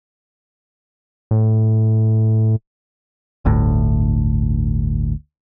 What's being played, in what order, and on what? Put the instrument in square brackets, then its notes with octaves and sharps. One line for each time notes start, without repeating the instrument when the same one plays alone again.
[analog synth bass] A2
[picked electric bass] G1 D2 A2